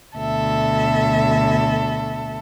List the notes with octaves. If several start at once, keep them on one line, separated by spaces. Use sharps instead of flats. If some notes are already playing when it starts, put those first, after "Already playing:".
D2 B2 A4 E5